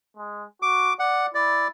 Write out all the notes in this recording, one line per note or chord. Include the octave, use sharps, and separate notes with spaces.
G#3
F#4 D6
D5 F#5
E4 D5